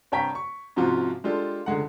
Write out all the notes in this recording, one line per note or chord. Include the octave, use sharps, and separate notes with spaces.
C2 G2 C#5 G5 A#5 B6
C#6
G#2 C3 F3 C#4 F4 F#4
G#3 D4 F4 G4 A4
C#2 D3 G#3 F#5